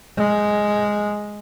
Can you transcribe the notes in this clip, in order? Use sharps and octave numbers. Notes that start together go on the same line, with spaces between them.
G#3